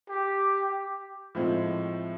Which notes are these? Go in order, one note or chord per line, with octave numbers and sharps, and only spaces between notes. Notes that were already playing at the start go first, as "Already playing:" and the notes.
G4
A2 F3 G#3 C4